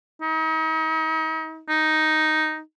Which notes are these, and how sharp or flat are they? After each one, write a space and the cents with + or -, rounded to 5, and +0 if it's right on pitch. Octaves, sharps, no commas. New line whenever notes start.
D#4 +40
D#4 +0